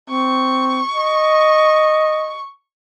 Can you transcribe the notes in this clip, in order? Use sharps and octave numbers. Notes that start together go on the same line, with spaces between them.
C4 C#6
D#5